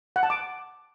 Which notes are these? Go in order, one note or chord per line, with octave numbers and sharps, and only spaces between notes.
F#5
A5
D6